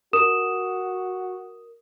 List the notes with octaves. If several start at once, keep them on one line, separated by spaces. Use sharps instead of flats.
F#4 A#4 D#6 E7